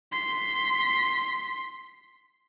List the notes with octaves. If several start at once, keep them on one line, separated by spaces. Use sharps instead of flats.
C6 B6